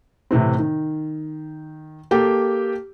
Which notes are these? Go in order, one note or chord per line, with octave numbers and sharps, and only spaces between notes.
A2 C3 E3 C4
D#3
A#3 G4 A4 G5